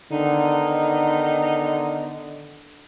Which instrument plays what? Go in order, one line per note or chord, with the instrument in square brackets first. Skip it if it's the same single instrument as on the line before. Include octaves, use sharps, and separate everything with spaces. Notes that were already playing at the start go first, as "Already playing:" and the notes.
[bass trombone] D3 [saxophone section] D#3 B3 D#4